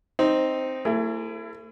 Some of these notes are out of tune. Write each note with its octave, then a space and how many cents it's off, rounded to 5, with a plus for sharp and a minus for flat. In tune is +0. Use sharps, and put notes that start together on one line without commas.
C4 +0 D#4 +0
A3 +45 E4 +25 G#4 +0